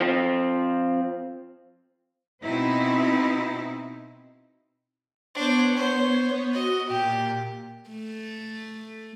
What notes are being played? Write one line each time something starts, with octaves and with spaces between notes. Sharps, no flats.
F3 C4
B2 C4 D#4 E4
B3 D4 C5 C#5
C5
F#4 D#5
A#2 G4
A3